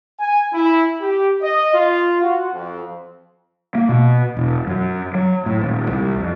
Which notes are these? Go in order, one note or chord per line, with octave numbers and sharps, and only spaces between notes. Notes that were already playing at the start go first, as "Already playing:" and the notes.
G#5
E4
G4
D#5
F4
F#4
F2
A#3
B2
E1
F#2
F#3
A2
D#1
C2
F2